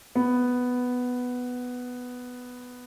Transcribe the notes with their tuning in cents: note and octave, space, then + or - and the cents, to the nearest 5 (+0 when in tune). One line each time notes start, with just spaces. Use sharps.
B3 +5